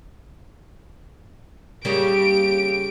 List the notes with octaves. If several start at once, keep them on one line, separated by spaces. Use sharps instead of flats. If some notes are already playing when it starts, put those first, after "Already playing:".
C#3 G3 A#3 G4 D7